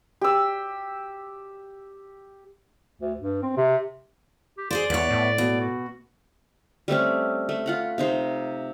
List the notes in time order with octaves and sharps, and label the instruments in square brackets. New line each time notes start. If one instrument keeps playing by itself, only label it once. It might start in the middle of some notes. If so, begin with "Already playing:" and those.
[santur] G4 E6
[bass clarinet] D2
G2
C4
C3
[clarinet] G4
[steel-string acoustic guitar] G#4 A#4 C5 [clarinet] D5
[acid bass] E2 [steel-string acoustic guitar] B3 C#5
[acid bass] A2
[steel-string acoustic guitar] B2
[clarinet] F#4
[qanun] G3 A3 C4 C#4
A3
F4 F#5 B5
C3 D#4 C5